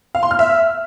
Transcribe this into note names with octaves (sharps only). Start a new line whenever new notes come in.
F5
C6
F6
E5